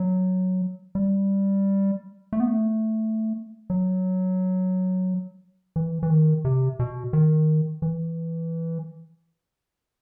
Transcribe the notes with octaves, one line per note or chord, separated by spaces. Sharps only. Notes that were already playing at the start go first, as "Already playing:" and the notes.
Already playing: F#3
G3
A3
B3
A3
F#3
E3
E3
D#3
C3
B2
D#3
E3